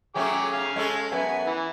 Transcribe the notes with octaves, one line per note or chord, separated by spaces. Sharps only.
F#3 A3 C#4 G#4 G5 D6
F5 G#5
G#3 C#4 A4
F#2 B3 G#5
E3